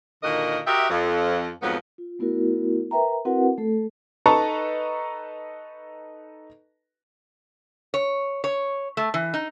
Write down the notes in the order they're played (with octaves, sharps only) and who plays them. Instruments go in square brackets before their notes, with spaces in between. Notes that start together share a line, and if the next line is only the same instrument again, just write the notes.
[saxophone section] A#2 D3 D#3 F#4 A#4 D#5
F#4 G4 A#4 D#5 E5
F2
F2 G#2 F#3 B3
[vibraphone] F4
A3 B3 E4 F#4 A#4
A#4 B4 E5 G5 A#5
C4 E4 F#4 A#4 B4 F#5
A3 A4
[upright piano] D#4 A4 B4 A5 A#5 C#6
[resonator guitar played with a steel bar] C#5
C#5
A3
E3
D#4